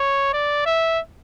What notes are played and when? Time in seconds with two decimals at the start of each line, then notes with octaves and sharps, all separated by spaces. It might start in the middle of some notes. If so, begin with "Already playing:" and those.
Already playing: C#5
0.33 D5
0.66 E5